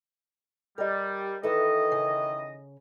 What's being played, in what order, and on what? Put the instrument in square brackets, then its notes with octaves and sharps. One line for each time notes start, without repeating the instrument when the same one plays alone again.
[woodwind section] G3 [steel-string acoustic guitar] A#4 D#5
[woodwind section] D#3 E3 D#5 [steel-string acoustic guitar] A4 B4 E5
[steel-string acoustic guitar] C#3